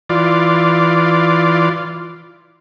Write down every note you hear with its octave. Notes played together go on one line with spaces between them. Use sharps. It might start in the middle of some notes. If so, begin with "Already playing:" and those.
E3 F4 D5